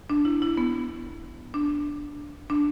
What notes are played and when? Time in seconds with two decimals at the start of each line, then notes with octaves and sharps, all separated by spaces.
0.10 D4
0.25 E4
0.42 E4
0.57 B3
1.54 D4
2.50 D4